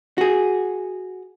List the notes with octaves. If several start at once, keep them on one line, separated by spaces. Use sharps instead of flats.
F#4 G#4